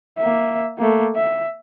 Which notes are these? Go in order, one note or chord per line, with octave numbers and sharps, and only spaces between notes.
A#3 E5
A3 A#3
E5